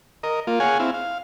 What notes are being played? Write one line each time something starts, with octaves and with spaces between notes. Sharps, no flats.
A#4 D#5
A#3 F4
G#4 C#5 F5 F#5 G#5
C4 E4 F5
F5